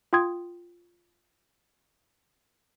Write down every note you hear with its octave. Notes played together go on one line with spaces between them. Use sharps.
F4 G5 C6 D#6 G#6